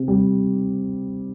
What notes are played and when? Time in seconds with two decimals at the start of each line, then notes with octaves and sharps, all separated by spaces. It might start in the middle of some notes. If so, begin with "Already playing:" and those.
Already playing: C3
0.08 G3